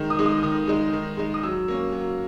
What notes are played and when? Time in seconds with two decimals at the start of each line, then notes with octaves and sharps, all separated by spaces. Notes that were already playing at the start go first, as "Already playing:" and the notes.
Already playing: D#3 G#3 D#4 A#5
0.10 D#6
0.19 G#3 D#4
0.26 D#6
0.43 D#3 D#6
0.67 G#3 D#4
0.93 D#3
1.17 G#3 D#4
1.34 D#6
1.43 F#3 E6
1.68 A#3 C#4
1.92 F#3